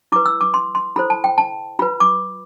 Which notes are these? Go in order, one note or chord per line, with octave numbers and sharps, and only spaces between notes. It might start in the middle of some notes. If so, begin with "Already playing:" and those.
E4 B4 D6
E6
D6
C6
C6
E4 A4 C5 B5
A5
G5
A5
F4 B4 B5
D6